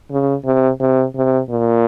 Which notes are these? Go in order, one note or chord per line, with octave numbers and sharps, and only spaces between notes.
C#3
C3
C3
C3
A#2